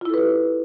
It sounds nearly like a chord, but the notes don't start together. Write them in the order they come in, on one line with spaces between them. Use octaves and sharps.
F4 E4 A4 B4 G4